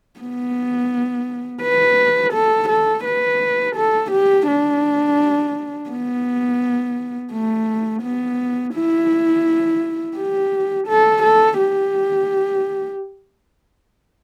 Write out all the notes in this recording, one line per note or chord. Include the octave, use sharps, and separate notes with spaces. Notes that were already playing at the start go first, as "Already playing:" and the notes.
B3
B4
A4
A4
B4
A4
G4
D4
B3
A3
B3
E4
G4
A4
A4
G4